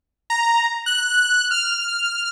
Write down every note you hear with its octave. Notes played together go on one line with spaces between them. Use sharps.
A#5
F#6
F6